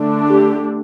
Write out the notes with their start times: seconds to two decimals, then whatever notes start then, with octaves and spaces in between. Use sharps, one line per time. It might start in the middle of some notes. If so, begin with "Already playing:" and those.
Already playing: D3 A3 D4
0.27 G4